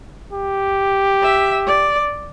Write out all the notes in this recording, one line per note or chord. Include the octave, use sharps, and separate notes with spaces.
G4
E5
D5